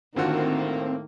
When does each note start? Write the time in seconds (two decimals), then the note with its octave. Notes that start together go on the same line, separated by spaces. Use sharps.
0.16 A2 D3 D#3 A#3 C4 F4 F#4